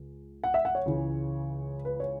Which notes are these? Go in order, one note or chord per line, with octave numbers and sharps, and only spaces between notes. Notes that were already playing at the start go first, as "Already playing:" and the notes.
Already playing: C#2
F#5
E5
F#5
C#5
C#2 C#3 E3
B4
C#5